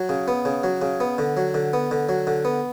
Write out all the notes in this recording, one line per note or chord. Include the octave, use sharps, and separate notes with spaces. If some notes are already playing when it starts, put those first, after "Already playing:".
Already playing: F#3
C#3
B3
C#3
F#3
C#3
B3
D3
F#3
D3
B3
D3
F#3
D3
B3